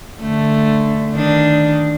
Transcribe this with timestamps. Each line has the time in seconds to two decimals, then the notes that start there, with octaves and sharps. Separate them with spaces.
0.20 D3 A3
1.14 D#3 D4